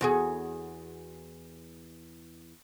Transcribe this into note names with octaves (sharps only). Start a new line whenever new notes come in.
E2 F#4 G#4